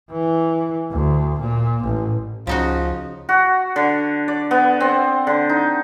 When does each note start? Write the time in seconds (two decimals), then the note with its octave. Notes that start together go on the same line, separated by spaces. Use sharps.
0.11 E3
0.91 D2
1.40 A#2
1.84 A1
2.47 C#2 C#3 F3 D#4 F#4
3.29 F#4
3.76 D3
4.28 D5
4.51 B3
4.80 C4
5.27 D3
5.49 D#4